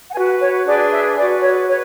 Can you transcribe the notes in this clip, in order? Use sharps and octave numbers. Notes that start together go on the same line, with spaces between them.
F#5
F#4 B4 G#5
C#5
D4 G#4 B4 D5
E5
F#4 B4 D5
C#5
B4 C#5